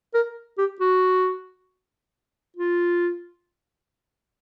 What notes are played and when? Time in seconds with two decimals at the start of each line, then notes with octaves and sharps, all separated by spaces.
0.14 A#4
0.58 G4
0.80 F#4
2.57 F4